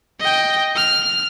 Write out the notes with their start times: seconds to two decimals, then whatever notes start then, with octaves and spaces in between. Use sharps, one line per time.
0.21 D#5 G5
0.76 F6